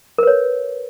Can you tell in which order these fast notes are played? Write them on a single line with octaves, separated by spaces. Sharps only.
A#4 B4 C#5